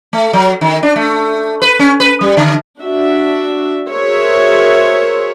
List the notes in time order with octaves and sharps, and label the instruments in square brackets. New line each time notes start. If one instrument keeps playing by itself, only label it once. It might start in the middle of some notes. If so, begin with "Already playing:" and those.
[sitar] A3
F#3
D#3
D4
A3
B4
C#4
B4
G3
D3
[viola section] D4 F#4 E5
F#4 G#4 A#4 C5 C#5 E5